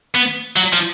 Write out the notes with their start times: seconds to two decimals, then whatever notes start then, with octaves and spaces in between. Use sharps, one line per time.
0.15 B3
0.56 F#3
0.73 F3